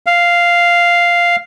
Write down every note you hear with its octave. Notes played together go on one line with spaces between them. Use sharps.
F5